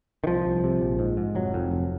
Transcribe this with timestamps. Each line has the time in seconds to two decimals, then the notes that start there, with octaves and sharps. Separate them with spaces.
0.24 D#3
0.27 C2 F3
0.46 C2
0.64 C3
0.81 A#1
0.99 G#2
1.17 G#2
1.35 F1 F#3
1.54 F2
1.71 F1